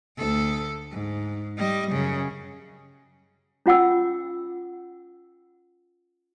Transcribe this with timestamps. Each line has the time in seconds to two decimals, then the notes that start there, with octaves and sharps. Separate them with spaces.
0.17 D2 A4
0.91 G#2
1.57 G3 D#5
1.92 F#2 C#3
3.66 C#4 F4 F#5 G5 E6